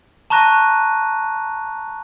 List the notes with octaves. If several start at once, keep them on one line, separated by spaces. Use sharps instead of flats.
A5 A#5 C#6 F#6 A#6 D#7